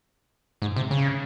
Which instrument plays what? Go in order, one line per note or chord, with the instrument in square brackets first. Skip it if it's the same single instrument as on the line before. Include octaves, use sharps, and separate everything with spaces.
[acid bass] G#2
C3
C#3